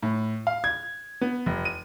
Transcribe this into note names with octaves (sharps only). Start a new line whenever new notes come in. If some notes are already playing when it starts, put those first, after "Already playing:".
A2
F5
G#6
B3
F1
D#7